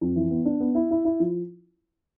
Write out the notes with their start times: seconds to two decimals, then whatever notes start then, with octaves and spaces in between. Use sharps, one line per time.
0.01 F2
0.16 E3
0.31 B3
0.45 D4
0.60 B3
0.75 E4
0.91 E4
1.05 E4
1.20 F3